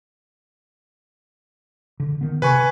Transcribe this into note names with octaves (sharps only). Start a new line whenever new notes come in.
D3
D#3 B3
C3 B4 G#5 C#6